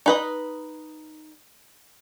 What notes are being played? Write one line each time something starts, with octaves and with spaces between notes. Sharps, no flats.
D#4 B4 D#5